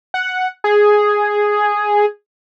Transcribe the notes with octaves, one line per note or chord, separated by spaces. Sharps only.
F#5
G#4